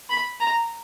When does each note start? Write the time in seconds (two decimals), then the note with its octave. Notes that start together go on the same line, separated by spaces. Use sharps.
0.10 B5
0.40 A#5